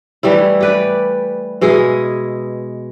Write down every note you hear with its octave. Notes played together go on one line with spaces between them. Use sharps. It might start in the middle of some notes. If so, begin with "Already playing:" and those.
E3 G3 A3 E4
G4 B4 D5
B2 G#3 E4 G#4